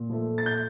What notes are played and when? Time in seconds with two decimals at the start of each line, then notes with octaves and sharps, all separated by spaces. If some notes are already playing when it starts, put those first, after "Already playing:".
Already playing: A#2
0.10 F3 A3
0.38 A6
0.46 G6